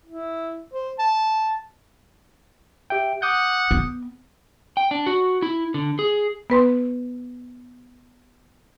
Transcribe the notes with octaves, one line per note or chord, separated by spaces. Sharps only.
E4
C5
A5
G4 E5 G5
F#5 D6 D#6 G6
B3
G5
D4
F#4
E4
D3
G#4
B3 B4 C6